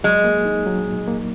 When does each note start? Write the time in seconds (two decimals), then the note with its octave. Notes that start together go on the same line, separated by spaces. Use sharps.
0.04 F#3 G#3
0.24 A#3
0.45 D#4
0.66 F#3
0.87 A#2
1.08 A#3